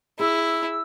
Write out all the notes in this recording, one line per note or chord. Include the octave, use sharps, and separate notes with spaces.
E4 G#4 E6